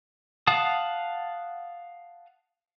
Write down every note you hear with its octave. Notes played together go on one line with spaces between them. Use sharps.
F5 F#5 A5 D#6